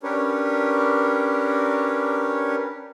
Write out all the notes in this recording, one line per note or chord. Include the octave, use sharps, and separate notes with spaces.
C#4 D4 G4 A#4 B4 C#5